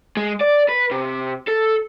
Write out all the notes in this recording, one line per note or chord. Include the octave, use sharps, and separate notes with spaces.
G#3
D5
B4
C3
A4